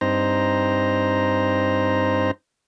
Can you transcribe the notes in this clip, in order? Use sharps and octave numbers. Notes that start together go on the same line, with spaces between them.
G2 C4 D#4 C5 A#5